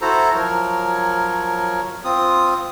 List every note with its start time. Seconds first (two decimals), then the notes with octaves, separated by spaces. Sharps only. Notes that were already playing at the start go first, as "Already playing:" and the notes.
0.01 E4 F#4 A4 C5 A#5
0.35 F3 F#3 A#4 C#5
2.04 C4 F4 D#6